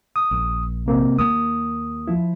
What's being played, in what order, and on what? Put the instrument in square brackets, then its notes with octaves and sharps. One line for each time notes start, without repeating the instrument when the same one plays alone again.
[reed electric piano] D#6
[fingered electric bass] A#1
[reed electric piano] C3 A#3 C4
[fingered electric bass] D#2 A#3 [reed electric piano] D#6
[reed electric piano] F3 E4